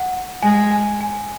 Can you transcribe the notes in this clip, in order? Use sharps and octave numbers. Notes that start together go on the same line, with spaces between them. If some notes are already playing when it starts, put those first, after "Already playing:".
Already playing: F#5
G#3 G#5
G#5
G#5